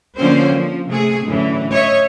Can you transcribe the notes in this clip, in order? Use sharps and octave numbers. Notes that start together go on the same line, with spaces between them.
D3 F3 A#3 C4 C#4 C5
F3
C3 A3 G#4
F#2 A2 D3 E3
C#5 D#5 E5